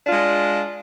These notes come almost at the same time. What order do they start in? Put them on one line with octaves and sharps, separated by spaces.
D4 F4 G#3